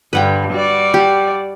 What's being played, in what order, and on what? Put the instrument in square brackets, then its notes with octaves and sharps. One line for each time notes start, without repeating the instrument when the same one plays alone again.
[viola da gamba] G2 D3 [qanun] B4 F#5 G5
[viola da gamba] G3 F#4 D5
[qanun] G4